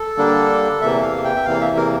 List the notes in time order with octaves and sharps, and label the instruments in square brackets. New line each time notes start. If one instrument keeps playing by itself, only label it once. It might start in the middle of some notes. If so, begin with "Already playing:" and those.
Already playing: [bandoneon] A4
D3 G3 A#3 D4
E2 C3 E3 A#3 E5
F5
G5
E5
E2 C3 E3 A#3 F5
E5
A#4